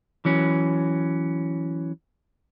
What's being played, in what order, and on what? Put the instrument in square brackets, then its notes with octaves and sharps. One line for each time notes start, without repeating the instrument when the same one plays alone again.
[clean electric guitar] E3 F#3 C#4